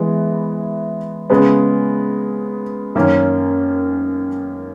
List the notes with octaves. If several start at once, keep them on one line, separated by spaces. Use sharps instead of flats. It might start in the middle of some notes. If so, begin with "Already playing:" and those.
Already playing: E3 G#3 B3
C#3 G#3 B3
F#2 D#3 A#3 C#4